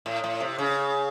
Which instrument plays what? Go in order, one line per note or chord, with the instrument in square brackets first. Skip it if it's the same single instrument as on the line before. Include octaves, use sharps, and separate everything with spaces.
[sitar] A2
A2
C3
C#3